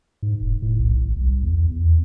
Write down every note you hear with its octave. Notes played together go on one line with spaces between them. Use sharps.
G#2
E1
A2
B1
G#1
C2
E2
E2